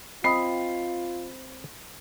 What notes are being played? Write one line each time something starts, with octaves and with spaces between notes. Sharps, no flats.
C4 F4 D#5 B5 C7